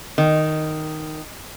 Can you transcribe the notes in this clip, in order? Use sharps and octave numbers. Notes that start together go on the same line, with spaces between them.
D#3